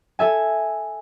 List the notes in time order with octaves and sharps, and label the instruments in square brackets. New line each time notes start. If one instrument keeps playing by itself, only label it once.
[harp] A4 E5 G#5